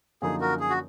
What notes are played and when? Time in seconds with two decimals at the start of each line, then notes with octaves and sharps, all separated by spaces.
0.22 F#2 D3 F3 A#3 D#4 G#4
0.41 F#4 A#4
0.60 G#4
0.70 F#4